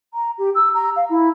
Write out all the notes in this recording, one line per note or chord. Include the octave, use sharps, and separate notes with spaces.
A#5
G4
E6
A#5
F5
E4